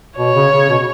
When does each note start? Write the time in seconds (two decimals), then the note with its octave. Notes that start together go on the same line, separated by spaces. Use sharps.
0.18 B2 C#5
0.35 C#3
0.53 C#3
0.69 B2